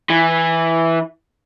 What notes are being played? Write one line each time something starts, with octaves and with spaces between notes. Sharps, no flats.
E3